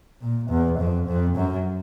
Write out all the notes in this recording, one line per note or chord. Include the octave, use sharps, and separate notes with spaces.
A#2
E2
F2
F2
F#2